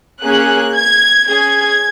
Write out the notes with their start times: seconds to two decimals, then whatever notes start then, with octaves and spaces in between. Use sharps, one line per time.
0.22 A#3 C#4 G#4 F#6
0.75 G#6
1.28 C#4 G#4 G#6